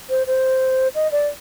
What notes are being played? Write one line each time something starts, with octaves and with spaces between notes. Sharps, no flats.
C5
C5
D#5
D5